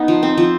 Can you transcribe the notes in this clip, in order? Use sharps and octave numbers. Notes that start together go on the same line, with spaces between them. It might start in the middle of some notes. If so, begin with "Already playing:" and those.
Already playing: B3 D#4
F3
C4
F3